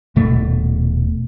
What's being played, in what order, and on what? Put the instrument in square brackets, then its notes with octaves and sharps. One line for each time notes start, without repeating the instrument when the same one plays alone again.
[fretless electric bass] D#1 B2 A3